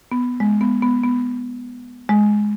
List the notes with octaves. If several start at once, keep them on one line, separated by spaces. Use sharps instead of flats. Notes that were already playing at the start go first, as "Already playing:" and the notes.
B3
G#3
B3
B3
B3
G#3